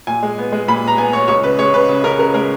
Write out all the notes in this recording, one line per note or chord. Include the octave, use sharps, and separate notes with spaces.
A#2 G#5
G#3
B3
G#3
A#2 B5
B3 A#5
B3 G#5
B3 C#5
C#2 C#5
C#3 B4
G#3 C#5
C#3 B4
C#3
C#3 A#4
C#3 A#4
G#3 A#4